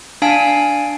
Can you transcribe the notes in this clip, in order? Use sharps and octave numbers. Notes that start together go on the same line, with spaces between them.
D4 F5 G#5 A5 D7